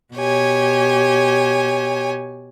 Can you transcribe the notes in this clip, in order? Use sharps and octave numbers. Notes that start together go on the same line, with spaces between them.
B2 G4 C#5 G#5